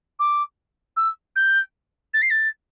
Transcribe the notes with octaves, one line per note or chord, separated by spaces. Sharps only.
D6
E6
G6
A6
C7
A6